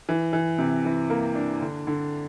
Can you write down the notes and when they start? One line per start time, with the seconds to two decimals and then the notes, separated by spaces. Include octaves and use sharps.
0.09 E3
0.33 E3
0.58 C3
0.85 E3
1.10 A#3
1.35 D4
1.61 D3
1.87 D3